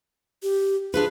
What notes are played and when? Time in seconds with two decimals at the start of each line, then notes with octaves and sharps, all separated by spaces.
0.43 G4
0.94 D4 F4 G#4 B4